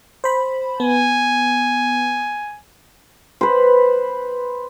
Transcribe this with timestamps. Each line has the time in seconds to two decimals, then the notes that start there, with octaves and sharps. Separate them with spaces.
0.24 C5 B5
0.80 B3 G#5
3.41 B4 C5